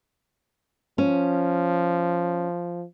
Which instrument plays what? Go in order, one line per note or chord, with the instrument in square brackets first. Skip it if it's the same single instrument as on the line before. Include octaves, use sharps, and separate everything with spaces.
[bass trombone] F3 [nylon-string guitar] C#4